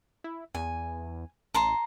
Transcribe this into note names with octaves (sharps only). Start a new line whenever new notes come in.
E4
E2 G#5
A1 A5 A#5 C6